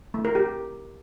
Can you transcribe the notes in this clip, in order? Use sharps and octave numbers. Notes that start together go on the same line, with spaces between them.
A3
A#4
G4